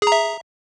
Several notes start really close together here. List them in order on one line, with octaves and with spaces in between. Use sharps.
G#4 A#5 E5